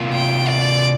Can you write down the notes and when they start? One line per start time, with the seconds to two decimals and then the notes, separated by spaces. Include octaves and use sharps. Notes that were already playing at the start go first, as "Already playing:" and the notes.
Already playing: C3 A#3 F4
0.13 G5
0.48 D5